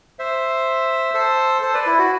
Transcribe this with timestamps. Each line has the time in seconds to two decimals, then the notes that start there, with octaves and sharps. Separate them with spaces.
0.19 C5 E5
1.14 A4 C5
1.62 A4 C5
1.74 B4 D5
1.86 E4
1.98 F#4